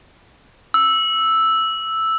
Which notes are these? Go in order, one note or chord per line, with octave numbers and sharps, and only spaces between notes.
E6